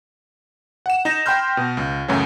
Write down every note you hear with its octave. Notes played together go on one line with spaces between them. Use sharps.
F#5 E7
D#4 A#6 E7
G5 B5 C6 F6 G6
B2
C#2
F#2 A2 C#3 E3 F#3